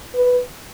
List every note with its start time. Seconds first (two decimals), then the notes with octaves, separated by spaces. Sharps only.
0.15 B4